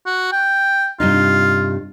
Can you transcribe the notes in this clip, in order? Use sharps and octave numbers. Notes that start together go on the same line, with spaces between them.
F#4
G5
G2 C3 D#4 F4